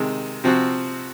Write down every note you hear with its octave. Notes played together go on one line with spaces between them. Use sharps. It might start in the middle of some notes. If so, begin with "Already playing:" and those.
Already playing: C3 D#3 G#3
C3 F3 C4 F#4